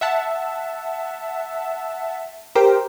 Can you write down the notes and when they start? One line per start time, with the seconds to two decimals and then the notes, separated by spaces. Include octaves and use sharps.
0.01 E5 F#5 A5
2.55 G4 A#4 C5 G5